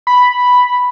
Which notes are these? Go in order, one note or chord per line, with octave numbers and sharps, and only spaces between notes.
B5